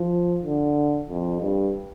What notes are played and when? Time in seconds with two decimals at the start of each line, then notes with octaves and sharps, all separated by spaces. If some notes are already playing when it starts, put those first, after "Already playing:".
Already playing: F3
0.43 D3
1.09 F2
1.42 G2